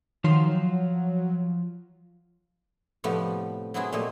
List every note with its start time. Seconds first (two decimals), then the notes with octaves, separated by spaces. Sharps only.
0.24 D#3 F3 F#3 F4 F5 C6
3.04 A2 C3 F3 G3 A3 B3
3.74 F#3 B3 C4 E4 G#4
3.92 A#2 G3 A3 D#5